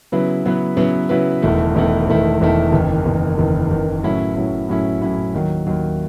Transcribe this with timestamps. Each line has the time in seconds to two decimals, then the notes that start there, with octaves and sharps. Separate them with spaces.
0.12 C#3 F#3 B3 E4 B4
0.44 C#3 F#3 B3 E4 B4
0.77 C#3 F#3 B3 E4 B4
1.09 C#3 F#3 B3 E4 B4
1.42 E1 E2 D#3 A3 E4
1.75 E1 E2 D#3 A3 E4
2.08 E1 E2 D#3 A3 E4
2.41 E1 E2 D#3 A3 E4
2.72 F#1 E2 D#3
3.05 F#1 E2 D#3
3.38 F#1 E2 D#3
3.71 F#1 E2 D#3
4.03 A2 F#3 C#4 E4
4.35 A2 F#3 C#4 E4
4.69 A2 F#3 C#4 E4
5.01 A2 F#3 C#4 E4
5.33 D#2 D#3 F#3
5.67 D#2 D#3 F#3